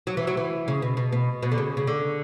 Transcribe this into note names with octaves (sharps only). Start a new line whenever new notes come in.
F#3
E3
F#3
E3
C#3
B2
B2
B2
B2
D3
C#3
C#3
D3